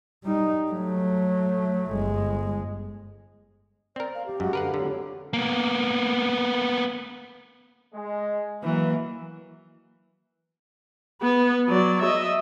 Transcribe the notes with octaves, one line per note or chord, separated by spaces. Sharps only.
G3 D#4
F#3 A3
G1 G#3
C4 A#4 D5
F5
G4
F#2 G#3 F#4
D3 A#4 B4 F5 F#5
F2 D3 F#3
A#3 B3
G#3
E3 F#3 A#3 B4 E5
B3 B4
F#3 D5
D#5 E5